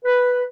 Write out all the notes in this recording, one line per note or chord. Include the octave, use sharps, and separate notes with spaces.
B4